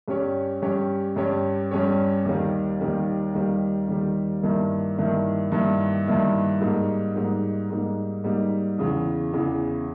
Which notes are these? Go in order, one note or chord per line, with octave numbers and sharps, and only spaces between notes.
G2 G3 C#4 G4 C#5
G2 G3 C#4 G4 C#5
G2 G3 C#4 G4 C#5
G2 G3 C#4 G4 C#5
D#2 D#3 G3
D#2 D#3 G3
D#2 D#3 G3
D#2 D#3 G3
G2 D#3 A#3 E4
G2 D#3 A#3 E4
G2 D#3 A#3 E4
G2 D#3 A#3 E4
G#2 G3 A#3 D#4
G#2 G3 A#3 D#4
G#2 G3 A#3 D#4
G#2 G3 A#3 D#4
E2 C#3 E3
E2 C#3 E3